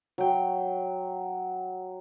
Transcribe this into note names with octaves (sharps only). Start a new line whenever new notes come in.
F#3 G5